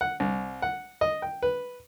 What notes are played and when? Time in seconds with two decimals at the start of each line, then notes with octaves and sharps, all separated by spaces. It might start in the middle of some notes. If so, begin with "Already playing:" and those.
0.01 F#5
0.20 C2
0.62 F#5
1.01 D#5
1.22 G5
1.42 B4